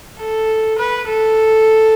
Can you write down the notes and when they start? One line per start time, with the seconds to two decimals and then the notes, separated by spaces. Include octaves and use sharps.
0.19 A4
0.79 B4
1.08 A4